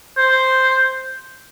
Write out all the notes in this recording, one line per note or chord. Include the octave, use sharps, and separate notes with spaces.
C5